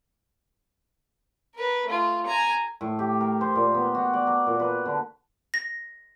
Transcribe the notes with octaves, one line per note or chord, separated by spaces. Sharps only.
A#4 B4
A3 F4
G#5 A#5
A2
G4
A#4
C5
A#2
B3
F#4
D5
A#4
A#2
B4
D3
A#6